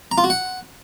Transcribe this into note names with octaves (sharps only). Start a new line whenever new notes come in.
A#5
F4
F#4
F#5